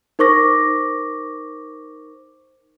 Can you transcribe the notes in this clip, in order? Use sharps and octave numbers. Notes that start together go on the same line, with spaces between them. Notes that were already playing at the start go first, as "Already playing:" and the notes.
D#4 A#4 C5 C#6 D6 A#6